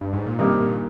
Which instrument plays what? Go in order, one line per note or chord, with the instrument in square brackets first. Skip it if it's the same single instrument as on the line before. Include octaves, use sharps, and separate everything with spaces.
[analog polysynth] G2
G#2
A#2
[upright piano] G2 D#3 A#3 D#4 G4 [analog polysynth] C3
[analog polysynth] C3
A#2